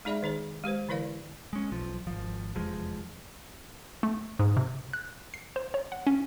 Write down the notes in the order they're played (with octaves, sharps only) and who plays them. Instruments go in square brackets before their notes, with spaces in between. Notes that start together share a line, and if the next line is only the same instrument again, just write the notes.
[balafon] G#3 D#4 G#4 D5 E5 B5
D#3 D#4 G#4 C#5
G#3 G4 B4 C5
D3 E3 E4 A#4 D5 F5
[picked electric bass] G#3 C#4
B1 F3
G#1 F3
F1 E2 F3 G#3
[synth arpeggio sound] A3
G#2
C3
F#6
C7
C5
C#5
F#5
C#4